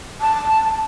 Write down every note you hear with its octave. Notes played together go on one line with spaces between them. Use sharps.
A5